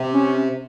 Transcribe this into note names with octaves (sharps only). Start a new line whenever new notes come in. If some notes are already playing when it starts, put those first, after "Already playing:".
Already playing: C3
C#4